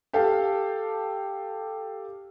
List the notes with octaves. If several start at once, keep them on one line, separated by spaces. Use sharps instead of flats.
G4 A4 F5 A5